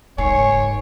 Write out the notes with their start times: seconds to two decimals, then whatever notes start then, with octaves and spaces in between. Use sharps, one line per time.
0.18 F#1 G#2 C#5 G#5 C7 C#7